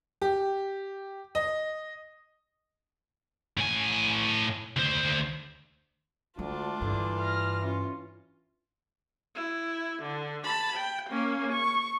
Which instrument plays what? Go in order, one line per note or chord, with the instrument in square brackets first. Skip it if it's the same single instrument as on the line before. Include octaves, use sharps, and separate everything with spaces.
[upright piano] G4
D#5
[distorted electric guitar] A2 G#5
D2 C5
[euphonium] D2 [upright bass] G#3 [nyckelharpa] D4 F4
[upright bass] G2 [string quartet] D3 [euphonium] E3
[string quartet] F6 A#6
[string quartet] C#4 [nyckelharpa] F4
[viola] E4
D3
A5 B5
G5
A#3 C#4
C#6